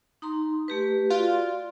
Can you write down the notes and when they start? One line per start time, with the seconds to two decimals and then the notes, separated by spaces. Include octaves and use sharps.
0.22 D#4 A#5 C6
0.68 A3 G4 B4
1.10 F4 F#4 D5